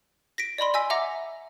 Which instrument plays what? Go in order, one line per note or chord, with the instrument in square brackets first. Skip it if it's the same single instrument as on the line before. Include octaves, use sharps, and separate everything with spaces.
[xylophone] A#6 B6 D7
D5 D#5 B5 C6
D#5 G#5 E6 B6
E5 F#5 A#5 D6 A#6